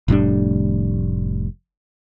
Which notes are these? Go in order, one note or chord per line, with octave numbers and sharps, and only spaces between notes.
F1 A2 G3 D4